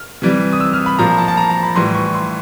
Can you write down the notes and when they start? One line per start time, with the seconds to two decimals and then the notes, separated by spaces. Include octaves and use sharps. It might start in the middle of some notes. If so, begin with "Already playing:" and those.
Already playing: F6
0.22 C3 E3 G3
0.53 D#6
0.60 E6
0.73 F6
0.86 B5
0.99 A#2 F3 A#5
1.18 A5
1.28 A5
1.37 A#5
1.50 A#5
1.63 B5
1.75 A2 E3 G3 C6
1.94 C#6
2.14 C6